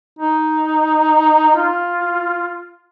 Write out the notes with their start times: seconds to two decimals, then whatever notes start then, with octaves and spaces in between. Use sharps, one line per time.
0.19 D#4
1.56 F4